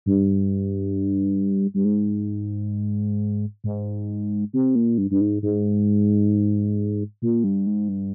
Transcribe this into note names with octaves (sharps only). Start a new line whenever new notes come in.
G2
G2
G#2
G#2
C3
A#2
G2
G2
G#2
G#2
A#2
G2
G#2
G2